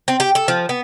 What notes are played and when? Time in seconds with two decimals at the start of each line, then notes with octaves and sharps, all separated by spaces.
0.08 C4
0.20 G4
0.35 A4
0.48 F3
0.69 B3